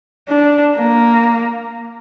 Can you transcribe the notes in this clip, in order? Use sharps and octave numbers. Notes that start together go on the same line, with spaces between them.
D4
A#3